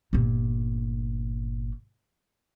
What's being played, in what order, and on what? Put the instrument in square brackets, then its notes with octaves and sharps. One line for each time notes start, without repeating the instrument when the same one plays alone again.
[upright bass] G1 A#2